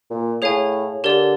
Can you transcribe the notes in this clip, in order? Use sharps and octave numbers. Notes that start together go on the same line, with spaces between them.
A#2
A2 G#4 C#5 F5 G#5
D3 G4 A#4 D5